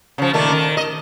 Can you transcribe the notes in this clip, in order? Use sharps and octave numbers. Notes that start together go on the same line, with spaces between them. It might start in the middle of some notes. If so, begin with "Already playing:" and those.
C#3 F3
A#2 D#3 A3
D#3
D#5